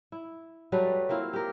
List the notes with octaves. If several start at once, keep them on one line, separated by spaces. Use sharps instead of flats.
E4
F#3 G3 A3 B4
A#3 C4 E4 F4
G4 A#4